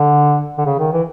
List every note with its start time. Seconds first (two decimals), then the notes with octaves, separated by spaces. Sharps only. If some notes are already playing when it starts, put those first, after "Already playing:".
Already playing: D3
0.58 D3
0.66 C#3
0.79 D#3
0.92 E3